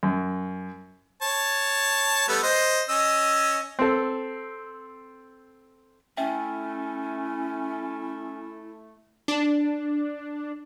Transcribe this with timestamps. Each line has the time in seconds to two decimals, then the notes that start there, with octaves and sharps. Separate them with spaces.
0.03 F#2
1.22 C#5 A5
2.28 G3 A3 B3
2.43 C5 D#5
2.89 C#4 D#5 E6
3.79 C4 A4
6.17 A3 C#4 E4 E5 G5
9.28 D4